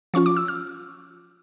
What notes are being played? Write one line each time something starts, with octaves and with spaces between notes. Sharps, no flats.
F3 C#4 F4 C#6
D6
E6
F6